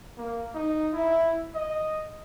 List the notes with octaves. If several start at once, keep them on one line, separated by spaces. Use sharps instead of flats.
A#3
D#4
E4
D#5